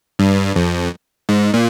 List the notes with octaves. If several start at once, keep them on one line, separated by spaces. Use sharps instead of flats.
G2
F2
G#2
A#2